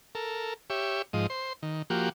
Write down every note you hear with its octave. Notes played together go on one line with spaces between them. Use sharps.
A4 A#4
G4 C#5 E5
G#2 F3 D#5
C5
D#3
F3 A#3 F#4 G4